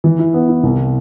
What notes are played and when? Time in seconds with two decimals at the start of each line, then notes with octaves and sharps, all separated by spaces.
0.04 E3
0.19 E4
0.34 B3
0.49 E4
0.63 C2